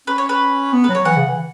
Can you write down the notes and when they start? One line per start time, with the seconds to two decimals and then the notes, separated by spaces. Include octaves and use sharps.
0.07 C#4 B4
0.18 C#5
0.29 B4
0.73 B3
0.84 F#3 B4
0.95 C#5
1.05 E3 F#5
1.17 C#3
1.28 E3